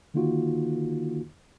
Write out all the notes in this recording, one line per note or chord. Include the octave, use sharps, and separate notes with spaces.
D3 D#3 A#3 D#4 F4 F#4